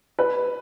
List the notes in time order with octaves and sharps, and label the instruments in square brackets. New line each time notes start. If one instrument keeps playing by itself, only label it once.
[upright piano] B4